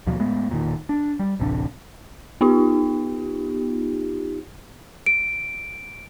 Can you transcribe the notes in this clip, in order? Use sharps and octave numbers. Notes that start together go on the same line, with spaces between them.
D#2 B2 F3 F#3
A2 G#3 B3
E1 A#2 D#3
D4
G3
D1 A1 C3 D4
B3 D#4 F4 G4
D7